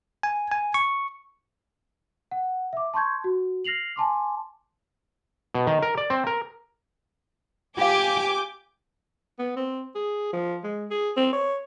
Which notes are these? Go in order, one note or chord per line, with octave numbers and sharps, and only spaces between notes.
G#5
G#5
C#6
F#5
E5 D6
A5 C6 C#6 G6 G#6
F#4
F6 A#6 C7 F7 F#7
G#5 A5 C6 D6
B2
D#3
A#4
D5
C4
A#4
F4 G4 F5 G#5 D6 G6
B3
C4
G#4
F3
G#3
G#4
C4
C#5